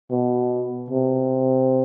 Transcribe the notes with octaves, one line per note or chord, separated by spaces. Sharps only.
B2
C3